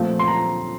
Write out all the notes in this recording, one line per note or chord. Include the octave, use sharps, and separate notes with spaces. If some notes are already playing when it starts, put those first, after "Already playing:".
Already playing: A#2 F3 A3 C4
C6
A#5